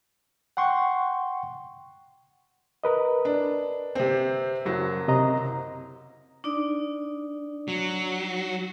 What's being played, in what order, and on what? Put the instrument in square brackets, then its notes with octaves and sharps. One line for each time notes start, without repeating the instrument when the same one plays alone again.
[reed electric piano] F#5 G5 C6 C#6
A#4 B4 D#5
[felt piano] D4
C3 C4
F#1 F#3
[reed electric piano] C3 D#5 A#5
[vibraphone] D4 D#4 D5
[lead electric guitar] F#3